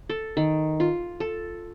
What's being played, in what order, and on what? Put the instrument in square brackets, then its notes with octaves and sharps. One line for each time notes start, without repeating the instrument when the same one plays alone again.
[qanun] A4
D#3
F4
A4